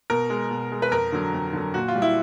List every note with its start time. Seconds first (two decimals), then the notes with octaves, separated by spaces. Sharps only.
0.10 B2 A#4
0.30 G#3
0.51 B2
0.72 G#3
0.82 B4
0.91 F2 A#4
1.12 D3 F#3
1.34 F2
1.53 D3 F#3
1.74 A#2 F#4
1.88 F4
1.95 G3
2.02 E4